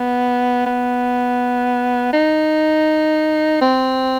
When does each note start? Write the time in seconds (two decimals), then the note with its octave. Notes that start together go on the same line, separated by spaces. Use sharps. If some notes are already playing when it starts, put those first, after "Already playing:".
Already playing: B3
0.66 B3
2.13 D#4
3.61 C4